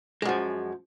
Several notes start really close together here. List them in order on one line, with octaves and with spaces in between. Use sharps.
G#3 F#2 F3